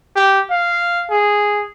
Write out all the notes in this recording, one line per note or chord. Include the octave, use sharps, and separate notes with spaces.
G4
F5
G#4